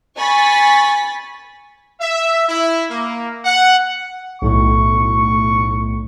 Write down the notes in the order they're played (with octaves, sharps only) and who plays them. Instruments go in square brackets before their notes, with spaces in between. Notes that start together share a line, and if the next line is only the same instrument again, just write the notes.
[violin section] G#5 B5 C#6 A6 B6
[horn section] E5
E4
A#3
F#5
[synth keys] B1 A2 [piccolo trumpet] C#6